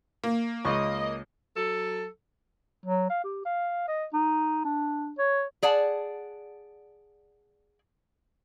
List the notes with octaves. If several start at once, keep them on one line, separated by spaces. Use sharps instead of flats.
A#3
C#2 D#5 C#6
F#3 A4
F#3
F5
G4
F5
D#5
D#4
D4
C#5
G#4 D5 F#5 A5